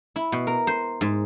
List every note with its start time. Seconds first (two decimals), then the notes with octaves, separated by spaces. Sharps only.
0.16 E4
0.32 B2
0.47 A#4
0.67 C5
1.01 G#2